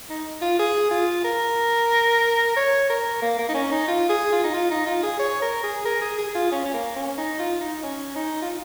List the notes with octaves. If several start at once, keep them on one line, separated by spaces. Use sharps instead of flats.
D#4
F4
G#4
F4
A#4
C#5
A#4
A#3
A#3
D#4
C#4
D#4
F4
G#4
F4
D#4
F4
D#4
F4
G#4
C#5
A#4
G#4
A#4
G#4
G#4
G#4
F4
C#4
C#4
A#3
C#4
D#4
F4
D#4
C#4
D#4
F4